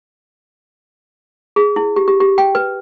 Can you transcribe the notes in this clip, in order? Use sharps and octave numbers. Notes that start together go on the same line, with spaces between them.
G#4
E4
G4
G4
G4
G5
B4